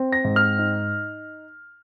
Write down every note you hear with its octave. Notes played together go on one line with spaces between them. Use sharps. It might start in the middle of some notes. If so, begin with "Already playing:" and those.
Already playing: C4
A#6
G#2
F6
D#4